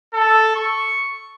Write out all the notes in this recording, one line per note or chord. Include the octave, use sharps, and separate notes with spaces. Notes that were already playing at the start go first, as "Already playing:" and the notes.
A4
C#6